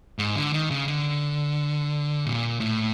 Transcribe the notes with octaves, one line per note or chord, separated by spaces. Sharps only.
G#2
D3
D#3
C#3
D3
A#2
A2